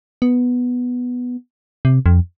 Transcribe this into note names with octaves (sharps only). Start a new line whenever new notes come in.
B3
C3
F2